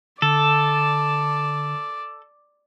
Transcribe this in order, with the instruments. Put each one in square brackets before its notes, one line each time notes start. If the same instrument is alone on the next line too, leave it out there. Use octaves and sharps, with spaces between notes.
[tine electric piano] D3 [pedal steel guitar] A4 [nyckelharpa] D5